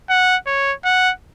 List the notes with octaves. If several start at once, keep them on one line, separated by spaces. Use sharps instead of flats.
F#5
C#5
F#5